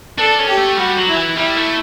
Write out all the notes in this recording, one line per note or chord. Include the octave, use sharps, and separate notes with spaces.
D4 A4
C#4
G4
A3
G3 F#4
F#3
E4
E3
G3 E4
A3